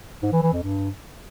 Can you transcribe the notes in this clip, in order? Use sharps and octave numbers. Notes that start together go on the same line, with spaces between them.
G#2
E3
E3
F2
G2